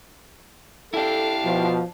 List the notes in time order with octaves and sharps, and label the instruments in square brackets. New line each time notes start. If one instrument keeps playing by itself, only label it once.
[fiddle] D4 F5 [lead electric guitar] E4 G4 [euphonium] A4
[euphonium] B2 [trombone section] F3